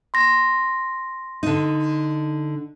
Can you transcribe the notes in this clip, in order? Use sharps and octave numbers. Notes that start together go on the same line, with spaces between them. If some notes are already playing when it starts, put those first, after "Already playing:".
C6 A#6
D3 D#4